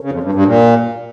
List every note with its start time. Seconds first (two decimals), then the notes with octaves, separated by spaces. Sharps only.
0.01 C#3
0.12 F2
0.23 G2
0.34 G2
0.45 A#2